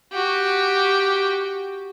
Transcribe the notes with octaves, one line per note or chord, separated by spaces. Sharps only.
F#4 G4